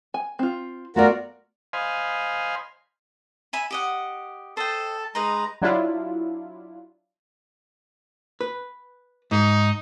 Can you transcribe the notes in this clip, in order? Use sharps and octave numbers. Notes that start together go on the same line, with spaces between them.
G#5
C4 F4
A3 B3 F4 F#4 A#4 D5
C5 D#5 F5 G#5 B5 C6
E5 G#5 B5
G4 D#5 F#5
A4 C5 D#5 G5 A5
G#3 D#4 B4 A#5 C6
F#3 D4 E4 F4
B4
G#2 D#4